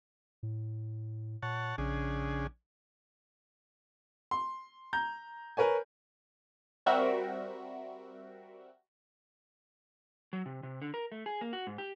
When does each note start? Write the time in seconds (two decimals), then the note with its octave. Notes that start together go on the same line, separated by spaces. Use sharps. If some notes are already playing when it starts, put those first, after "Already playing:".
0.43 A2
1.42 A#2 C#5 F#5 A5
1.78 A#1 C#3 D4 G#4
4.31 C6
4.93 A#5 G6
5.57 A#4 B4 C#5 G#5
6.86 G3 C4 F#4 A#4 E5
10.33 F#3
10.46 C3
10.63 C3
10.82 D3
10.94 A#4
11.12 A3
11.26 G#4
11.41 A#3
11.53 F#4
11.67 G#2
11.78 G4